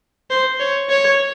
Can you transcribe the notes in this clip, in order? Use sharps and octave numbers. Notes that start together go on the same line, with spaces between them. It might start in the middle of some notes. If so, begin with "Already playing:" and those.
C5
C#5
C#5